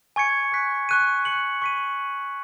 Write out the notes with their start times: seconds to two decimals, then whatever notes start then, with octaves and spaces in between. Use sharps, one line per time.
0.16 G#5 C#6 G#6 C#7
0.52 C#6 F#6 B6
0.89 C#6 F#6 D#7
1.25 F#6 C#7 F#7
1.62 C#6 B6 D#7